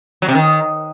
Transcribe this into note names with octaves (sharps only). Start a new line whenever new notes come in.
F#3
C3
D#3